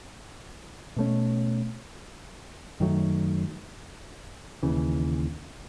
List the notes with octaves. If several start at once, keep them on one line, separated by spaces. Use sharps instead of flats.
B2 A3 C#4
F#2 D#3 F#3 A3
D#2 C#3 E3